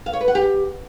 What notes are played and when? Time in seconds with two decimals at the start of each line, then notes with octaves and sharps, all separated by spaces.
0.06 F5
0.13 C#5
0.21 B4
0.28 F#5
0.35 G4